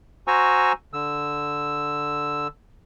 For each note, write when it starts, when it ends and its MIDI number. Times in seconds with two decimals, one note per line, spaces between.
0.28 0.72 66
0.28 0.72 72
0.28 0.72 80
0.28 0.72 82
0.28 0.72 85
0.28 0.72 88
0.93 2.47 50
0.93 2.47 88